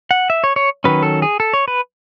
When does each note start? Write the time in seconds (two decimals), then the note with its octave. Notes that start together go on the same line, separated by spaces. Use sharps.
0.11 F#5
0.30 E5
0.44 C#5
0.56 C#5
0.84 D#3 F#3 C#4 B4
1.03 A4
1.22 G#4
1.40 A4
1.53 C#5
1.68 B4